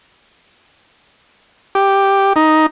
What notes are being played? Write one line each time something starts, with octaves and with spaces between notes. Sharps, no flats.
G4
D#4